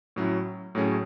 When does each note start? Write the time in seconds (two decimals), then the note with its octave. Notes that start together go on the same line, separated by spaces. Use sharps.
0.16 A2 F#3 C#4 E4
0.75 A2 F#3 A3 C#4 G#4